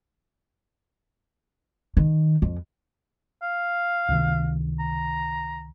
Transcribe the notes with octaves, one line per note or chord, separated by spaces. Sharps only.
D#3
F2
F5
C#2 C3 D#3
A#5